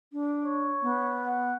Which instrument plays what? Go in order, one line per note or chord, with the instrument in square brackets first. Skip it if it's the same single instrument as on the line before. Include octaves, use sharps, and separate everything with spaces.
[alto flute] D4
[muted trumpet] C#5
[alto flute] B3
[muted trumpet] F#5